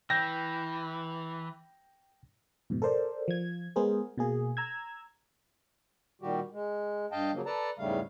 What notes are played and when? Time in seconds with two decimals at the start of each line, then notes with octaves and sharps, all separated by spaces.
0.10 E3 G5 G6 A#6
2.70 F2 G#2 B2
2.82 A4 A#4 C5 D5
3.28 F3 G#6
3.76 G#3 B3 G#4 A#4 C5
4.18 B2 A#3 G#4
4.57 A#5 E6 G#6
6.22 A#2 D#3 G3 F#4 G4
6.52 G#3
7.12 G2 D#5 F5 G5 A5
7.33 C#3 F3 F#3 A#3
7.46 A4 B4 D5 A5 A#5
7.79 E2 G#2 C#3 G3 A3 F5